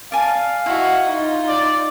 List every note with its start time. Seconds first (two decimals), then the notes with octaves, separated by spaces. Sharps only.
0.12 D5 F5 G#5 A5
0.66 E4 F#4 D#5
1.09 D#4 F4
1.48 D5